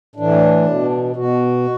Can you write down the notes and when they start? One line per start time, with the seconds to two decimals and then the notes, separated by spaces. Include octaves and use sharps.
0.16 A2 E3 D4
0.67 B2
1.16 B2 F#4